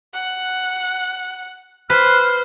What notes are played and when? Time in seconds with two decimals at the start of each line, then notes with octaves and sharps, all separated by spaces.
0.13 F#5
1.90 B4 C5 F6 F#6